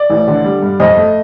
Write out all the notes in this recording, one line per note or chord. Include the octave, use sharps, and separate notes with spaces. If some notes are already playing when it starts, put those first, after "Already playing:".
Already playing: D5
A1
D3
G3
G2
F2 D#5
A3